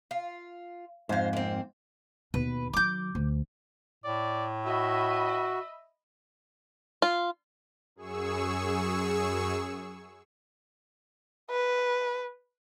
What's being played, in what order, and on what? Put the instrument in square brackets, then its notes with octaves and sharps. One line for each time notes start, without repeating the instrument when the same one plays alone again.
[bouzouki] F4
[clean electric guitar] F2 G#2 [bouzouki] F4 C5
[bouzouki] A#3 C4
[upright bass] D#2 B2 [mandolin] B4
[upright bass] D#3 F#3 [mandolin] D6 G6
[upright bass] D2
[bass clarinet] A2 [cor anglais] D5
[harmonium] F#4 [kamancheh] D#5 B5 [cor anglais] E5
[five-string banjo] F4
[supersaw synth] F#2 G#4 C#6 E6
[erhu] B4